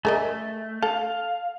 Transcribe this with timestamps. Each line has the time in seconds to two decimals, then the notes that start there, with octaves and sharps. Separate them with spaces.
0.05 A3 G#4 A#4 D#5
0.82 A4 F5